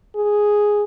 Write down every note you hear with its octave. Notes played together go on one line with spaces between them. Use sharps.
G#4